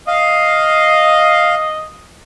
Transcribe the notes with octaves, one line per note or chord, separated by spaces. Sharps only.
D#5 F5